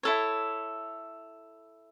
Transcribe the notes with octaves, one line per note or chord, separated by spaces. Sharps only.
E4 A4 C#5